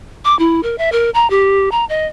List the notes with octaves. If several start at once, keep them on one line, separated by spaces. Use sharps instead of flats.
D6
E4
A#4
E5
A#4
A#5
G4
A#5
D#5